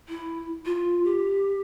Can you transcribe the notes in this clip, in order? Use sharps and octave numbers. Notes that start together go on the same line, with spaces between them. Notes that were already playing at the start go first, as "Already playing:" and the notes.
E4
F4
G4